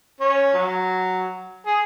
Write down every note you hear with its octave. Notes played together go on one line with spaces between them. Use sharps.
C#4
F#3
G#4